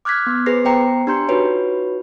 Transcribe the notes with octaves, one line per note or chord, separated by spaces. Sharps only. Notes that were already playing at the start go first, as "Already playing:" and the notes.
D6 F6 F#6 G#6 B6
B3
G#4 B4 C5 A#6 C7
B3 C5 G5 A#5 C7
D4 G4 A#5 C6 G6 C#7
D#4 F4 F#4 B4 C#5